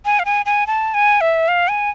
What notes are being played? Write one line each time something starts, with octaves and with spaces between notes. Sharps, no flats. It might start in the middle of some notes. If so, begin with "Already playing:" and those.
G#5
F5
G#5
G#5
A5
G#5
E5
F5
G#5